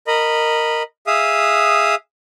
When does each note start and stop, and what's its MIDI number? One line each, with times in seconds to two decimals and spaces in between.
0.07 0.83 70
0.07 0.83 75
0.07 0.83 83
1.07 1.95 68
1.07 1.95 76
1.07 1.95 77
1.07 1.95 87